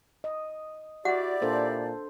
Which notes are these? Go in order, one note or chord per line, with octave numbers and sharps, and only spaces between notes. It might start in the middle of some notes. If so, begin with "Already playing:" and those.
D#5
E4 F#4 G4 D5 F#5
A#2 D4 A4 C5